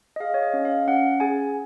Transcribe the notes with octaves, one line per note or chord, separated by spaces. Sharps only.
D#5
G#4 F5
C#5
D#5
C#4
F5
C#4 F#5
G#4 G#5